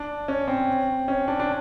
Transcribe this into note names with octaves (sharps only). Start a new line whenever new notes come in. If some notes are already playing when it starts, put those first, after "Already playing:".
Already playing: D4
C#4
C4
C#4
D4
D4